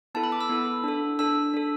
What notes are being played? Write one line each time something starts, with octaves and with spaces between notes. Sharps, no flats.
B3 E4 A4 A5
B5
D6
E6
B3 E4 A4
D4 A4
D4 A4 E6
D4 A4